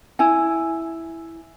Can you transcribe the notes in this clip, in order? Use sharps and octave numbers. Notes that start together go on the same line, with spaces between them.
E4 G#5